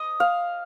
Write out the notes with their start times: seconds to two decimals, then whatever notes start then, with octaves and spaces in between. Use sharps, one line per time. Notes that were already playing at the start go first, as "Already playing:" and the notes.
Already playing: D#5
0.20 F5